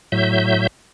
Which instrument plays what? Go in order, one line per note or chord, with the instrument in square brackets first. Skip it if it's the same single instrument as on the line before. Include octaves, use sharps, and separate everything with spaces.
[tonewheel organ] A2 F#3 E5 G6